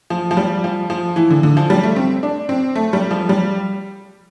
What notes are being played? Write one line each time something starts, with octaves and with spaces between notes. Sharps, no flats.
F3
F3
G3
F3
F3
E3
D3
D3
F3
G3
A3
C4
D4
C4
A3
G3
F3
G3